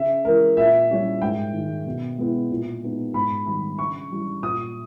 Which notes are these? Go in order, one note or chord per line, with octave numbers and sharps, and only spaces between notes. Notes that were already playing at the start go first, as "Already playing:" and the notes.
Already playing: C#3 E5
E3 G#3 A#4
A#2 E5
G3 C#4 E4
G#2 G5
D#3 G#3
B2
G#3 B3 E4
A#2
G#3 B3 D#4
G#2 B5
D#3 G3 B5
C#3 C#6
E3 G3
A#2 D#6